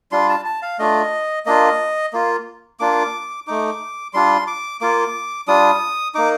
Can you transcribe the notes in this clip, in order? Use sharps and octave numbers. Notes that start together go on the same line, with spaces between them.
G3 D4 F4 C6
A5
A5
F5
A3 D4 F4 D#5
A#3 D4 F4 D#5
A#3 F4
A#3 D4 F4 D6
A3 D#4 D6
G3 D4 F4 C6
D6
A#3 F4 D6
G3 D4 F4 D#6
A#3 D#4 D6